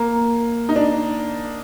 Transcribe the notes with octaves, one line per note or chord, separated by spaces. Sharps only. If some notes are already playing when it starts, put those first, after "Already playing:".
Already playing: A#3
D#4
D4